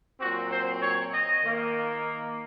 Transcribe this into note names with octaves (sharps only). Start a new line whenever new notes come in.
A#2 F#3 C4 F#4
C5
C#5
D#5
D#3 A#3